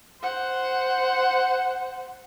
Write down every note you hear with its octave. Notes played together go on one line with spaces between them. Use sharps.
C5 F#5